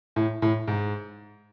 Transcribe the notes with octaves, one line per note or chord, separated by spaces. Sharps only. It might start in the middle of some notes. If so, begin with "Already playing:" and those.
A2
A2
G#2